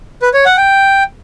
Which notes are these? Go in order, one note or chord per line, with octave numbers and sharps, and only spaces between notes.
B4
C#5
F#5
G5